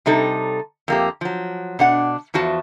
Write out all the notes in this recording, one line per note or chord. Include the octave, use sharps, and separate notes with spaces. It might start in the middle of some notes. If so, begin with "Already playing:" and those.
C3 G3 D#4 A4
F2 A#3 G4
F3 F#3
B2 D4 F#5
E2 F3 F#4 A5